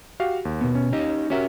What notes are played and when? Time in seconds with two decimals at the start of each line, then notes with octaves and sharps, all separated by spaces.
0.20 F#4 G4 F5
0.45 D#2
0.61 B2 B3
0.75 C#4
0.92 D#4 G4 D#5
1.30 C#4 F#4 G4 A#4 E5